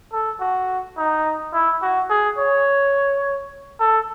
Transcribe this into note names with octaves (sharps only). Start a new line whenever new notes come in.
A4
F#4
D#4
E4
F#4
G#4
C#5
A4